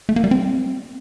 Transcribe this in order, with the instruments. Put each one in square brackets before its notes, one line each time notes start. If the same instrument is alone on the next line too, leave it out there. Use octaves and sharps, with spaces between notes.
[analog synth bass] A3
A#3
G3
C4